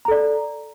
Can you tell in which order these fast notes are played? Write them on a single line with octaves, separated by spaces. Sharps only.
A#5 A4 D5